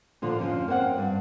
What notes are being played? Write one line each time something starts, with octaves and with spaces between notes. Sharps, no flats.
A#2 D3 F3
F2 F3 C#4
A#3 C4 C#4 F#5
G2